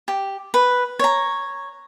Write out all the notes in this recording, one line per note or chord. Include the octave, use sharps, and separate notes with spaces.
G4
B4
C#5 A#5